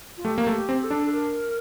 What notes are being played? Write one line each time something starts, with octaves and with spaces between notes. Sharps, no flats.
F4
A3 G4
A#3
A3
G4
C4
A4
D4
A4
A#4